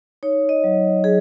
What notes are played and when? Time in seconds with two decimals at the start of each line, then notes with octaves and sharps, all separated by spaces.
0.23 D#4 C#5
0.49 D#5
0.64 F#3
1.04 F#3 G#4